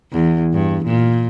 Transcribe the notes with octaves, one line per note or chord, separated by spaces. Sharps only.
E2
G2
A#2